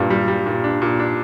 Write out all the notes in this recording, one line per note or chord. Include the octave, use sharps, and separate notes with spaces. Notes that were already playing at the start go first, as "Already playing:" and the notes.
Already playing: G2 A#2 G3
G3
G3
A#2
D4
A#2
D4